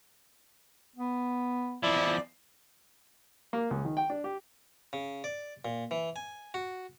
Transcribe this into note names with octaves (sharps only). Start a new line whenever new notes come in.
B3
E2 F3 E4 D5
A#3
C#2
D#3
G5
D4
G4
C#3
D5
A#2
E3
G#5
F#4